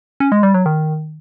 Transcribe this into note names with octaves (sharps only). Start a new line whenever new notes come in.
C#4
G#3
G3
F#3
D#3